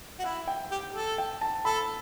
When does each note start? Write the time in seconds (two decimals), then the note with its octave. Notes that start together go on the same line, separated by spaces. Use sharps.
0.19 F#4
0.24 E4 F#5
0.48 G5
0.71 G4
0.94 A4
1.18 G5
1.41 A5
1.65 A4 B5